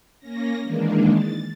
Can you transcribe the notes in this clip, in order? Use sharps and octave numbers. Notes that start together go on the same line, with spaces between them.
A#3 C#4 A#6
D#3 E3 G#3 A#3 D4
A6